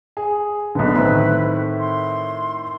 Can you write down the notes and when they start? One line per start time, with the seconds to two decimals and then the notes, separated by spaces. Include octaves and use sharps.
0.17 G#4
0.75 B1 D3 B4
0.95 A2 D#3 C4
1.79 C6